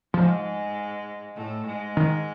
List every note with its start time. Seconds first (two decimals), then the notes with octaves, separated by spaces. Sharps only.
0.14 G#2 F3 G#3
1.36 A2 A3
1.66 G#2 G#3
1.97 D#3